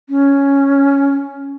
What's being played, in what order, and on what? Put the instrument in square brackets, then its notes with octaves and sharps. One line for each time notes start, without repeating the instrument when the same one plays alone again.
[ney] C#4